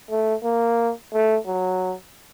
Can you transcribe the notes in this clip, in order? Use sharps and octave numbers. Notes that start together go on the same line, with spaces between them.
A3
A#3
A3
F#3